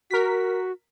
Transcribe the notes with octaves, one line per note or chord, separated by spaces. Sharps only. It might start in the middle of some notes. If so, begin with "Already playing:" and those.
F#4 A#4 B6